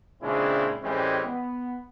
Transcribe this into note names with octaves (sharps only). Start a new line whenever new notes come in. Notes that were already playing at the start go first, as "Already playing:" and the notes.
A#2 C#3 G#3 C4 D4 E4
A2 E3 G3 G#3 C4 C#4
B3